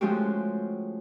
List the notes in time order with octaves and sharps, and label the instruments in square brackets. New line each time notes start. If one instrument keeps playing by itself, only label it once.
[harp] F3 G#3 A3 C#4 F#4 G4